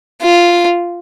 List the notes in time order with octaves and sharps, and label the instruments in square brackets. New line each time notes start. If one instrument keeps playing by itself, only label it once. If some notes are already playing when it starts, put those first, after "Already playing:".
[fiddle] F4